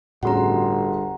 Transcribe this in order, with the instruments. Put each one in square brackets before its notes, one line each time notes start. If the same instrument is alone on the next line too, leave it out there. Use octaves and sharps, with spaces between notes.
[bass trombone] G1 [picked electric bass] A2 C#4 [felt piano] F#4 G#4 C6 [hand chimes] F#5 A#5